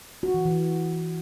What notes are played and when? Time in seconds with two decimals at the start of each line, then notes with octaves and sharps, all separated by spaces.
0.23 F#4
0.34 E3
0.45 E3